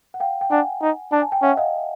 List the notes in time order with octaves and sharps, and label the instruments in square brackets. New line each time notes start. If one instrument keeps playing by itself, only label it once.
[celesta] F#5
F5 G5
G5
[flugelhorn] D4 [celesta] F#5 G#5
[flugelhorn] D#4
[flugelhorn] D4 [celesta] A5
[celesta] G#5
G5
[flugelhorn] C#4 [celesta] E5 F#5
[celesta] D#5 F5